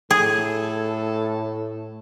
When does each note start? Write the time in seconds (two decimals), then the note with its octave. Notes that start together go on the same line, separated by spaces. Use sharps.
0.11 A2 G#4 A4